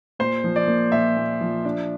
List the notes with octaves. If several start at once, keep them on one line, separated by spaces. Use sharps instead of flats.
A#2 C5
F3
D5
A#3
A#2 E5
A#2
F3
D4